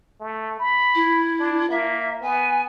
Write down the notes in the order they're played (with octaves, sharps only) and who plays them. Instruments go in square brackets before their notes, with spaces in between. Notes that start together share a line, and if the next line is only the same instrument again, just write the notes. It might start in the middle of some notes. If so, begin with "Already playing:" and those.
[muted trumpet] A3
B5
[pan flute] E4
[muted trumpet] D4
[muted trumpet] A#3 [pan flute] E5
[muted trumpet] B3 [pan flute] G#5